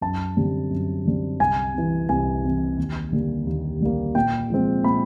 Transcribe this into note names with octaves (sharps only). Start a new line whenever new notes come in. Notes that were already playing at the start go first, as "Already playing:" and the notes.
F#2 A5
D3 G3 C4
F#2
D3 G3 C4
C2 G#5
C3 E3
C2 G#5
C3 E3
D#2
D3 G3 A#3
D#2
D3 G3 A#3
A#2 G5
F3 G#3 C4
A#2 B5